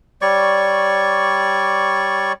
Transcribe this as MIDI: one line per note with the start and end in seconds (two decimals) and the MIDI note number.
0.22 2.32 55
0.22 2.32 73
0.22 2.32 74
0.22 2.32 85